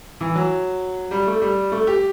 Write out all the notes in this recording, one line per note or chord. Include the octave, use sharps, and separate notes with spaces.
E3
F#3
G3
A3
G3
A3
G4